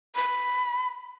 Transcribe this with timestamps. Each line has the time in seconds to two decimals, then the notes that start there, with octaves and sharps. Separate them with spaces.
0.15 B5